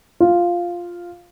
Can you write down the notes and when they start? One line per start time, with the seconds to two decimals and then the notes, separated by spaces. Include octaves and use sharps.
0.20 F4